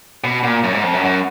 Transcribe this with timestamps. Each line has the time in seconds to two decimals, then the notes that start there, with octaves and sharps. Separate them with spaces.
0.24 B2
0.43 A#2
0.64 F#2
0.74 G#2
0.84 F2
0.93 F#2
1.04 F#2